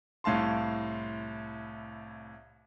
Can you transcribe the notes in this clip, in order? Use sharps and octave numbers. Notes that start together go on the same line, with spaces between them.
C2 A2 F5 A5 C6